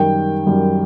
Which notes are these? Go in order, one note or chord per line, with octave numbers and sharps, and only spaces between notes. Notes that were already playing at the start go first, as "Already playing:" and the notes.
Already playing: F#2 D#3 G3 G5
F#2 D#3 G3